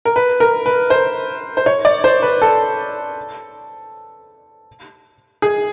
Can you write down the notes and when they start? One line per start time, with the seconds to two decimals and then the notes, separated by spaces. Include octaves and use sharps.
0.05 A#4
0.16 B4
0.40 A#4
0.66 B4
0.90 C5
1.57 C5
1.66 C#5
1.85 D5
2.04 C5
2.22 B4
2.42 A4
5.42 G#4